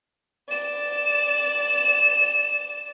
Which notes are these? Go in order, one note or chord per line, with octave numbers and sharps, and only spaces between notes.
D5 E7